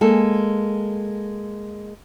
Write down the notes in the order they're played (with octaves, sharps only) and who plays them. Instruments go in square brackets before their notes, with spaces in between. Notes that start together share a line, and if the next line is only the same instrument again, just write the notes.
[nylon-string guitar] G#3 A#3 A4